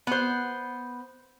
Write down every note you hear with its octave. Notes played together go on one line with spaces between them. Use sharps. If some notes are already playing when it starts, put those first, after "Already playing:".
B3 C5